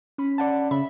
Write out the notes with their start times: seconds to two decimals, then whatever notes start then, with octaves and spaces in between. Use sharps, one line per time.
0.18 C#4 B5
0.38 D5 F#5 A5
0.71 C#3 C#4 E5 B5